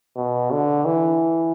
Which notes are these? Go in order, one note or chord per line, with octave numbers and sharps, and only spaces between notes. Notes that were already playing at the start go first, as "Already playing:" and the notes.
B2
D3
E3